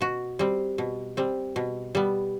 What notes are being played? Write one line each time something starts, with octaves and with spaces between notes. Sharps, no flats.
B2 F#4
G3 C4
B2
G3 C4
B2
G3 B3